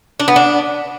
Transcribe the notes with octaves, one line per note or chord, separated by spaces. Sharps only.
D4
B3
D4